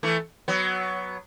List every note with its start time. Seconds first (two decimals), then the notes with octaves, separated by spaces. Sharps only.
0.03 E3 A3
0.48 F#3 B3